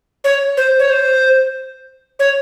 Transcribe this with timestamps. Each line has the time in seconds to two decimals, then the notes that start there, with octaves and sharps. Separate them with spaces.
0.24 C#5
0.57 C5
0.79 C#5
0.90 C5
2.19 C#5